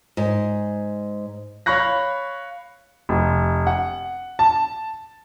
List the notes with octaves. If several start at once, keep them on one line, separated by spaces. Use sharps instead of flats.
G#2
C#5 F5 B5 C#6 F#6 A#6
F1
F#5
A5